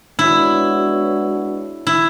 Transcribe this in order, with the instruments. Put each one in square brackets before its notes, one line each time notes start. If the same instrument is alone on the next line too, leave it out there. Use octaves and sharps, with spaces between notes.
[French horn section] G#3 B3 D4 F#4 C#5 [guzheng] E4
[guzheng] E4